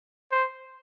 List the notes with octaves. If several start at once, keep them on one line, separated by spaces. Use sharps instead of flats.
C5